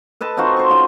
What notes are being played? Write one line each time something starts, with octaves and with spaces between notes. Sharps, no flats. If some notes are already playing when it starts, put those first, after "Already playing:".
A4 B4 D#5 A5
C4 D#4 F4 F#4
C5 C#6
C#3 F4 D#5